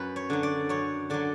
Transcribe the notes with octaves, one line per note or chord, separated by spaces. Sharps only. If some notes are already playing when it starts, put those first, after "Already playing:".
Already playing: F#2 B4
C#5
D3 F#3
D5
F#2 C#5
D3 F#3 D5